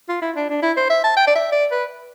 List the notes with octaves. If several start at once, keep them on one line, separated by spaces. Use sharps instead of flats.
F4
E4
D4
D4
E4
C5
E5
A5
G5
D5
E5
D5
B4